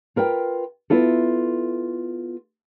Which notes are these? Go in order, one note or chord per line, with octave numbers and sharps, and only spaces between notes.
F4 A#4 B4 G5
B3 E4 F4 A4